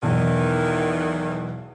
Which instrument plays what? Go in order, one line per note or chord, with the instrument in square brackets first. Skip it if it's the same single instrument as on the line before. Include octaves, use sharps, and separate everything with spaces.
[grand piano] B1 E2 [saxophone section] D#3 E3